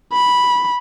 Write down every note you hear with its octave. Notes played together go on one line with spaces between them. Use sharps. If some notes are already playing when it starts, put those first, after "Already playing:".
B5